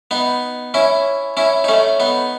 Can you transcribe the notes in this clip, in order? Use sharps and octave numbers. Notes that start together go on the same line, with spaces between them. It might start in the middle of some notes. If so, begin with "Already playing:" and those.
B3 D#4
C#4 E4
C#4 E4
D#4
A3 C#4
B3 D#4